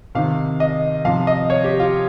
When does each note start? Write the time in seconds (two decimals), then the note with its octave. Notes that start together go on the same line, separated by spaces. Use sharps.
0.15 C3 D#3 F5
0.60 D#5
1.05 C3 F3 F5
1.27 D#5
1.50 C#5
1.64 G4
1.80 F4